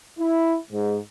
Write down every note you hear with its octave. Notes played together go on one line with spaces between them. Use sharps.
E4
G#2